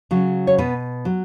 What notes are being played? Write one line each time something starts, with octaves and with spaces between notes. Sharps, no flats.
C#3 F#3
C#5
B2 B3 B4
F#3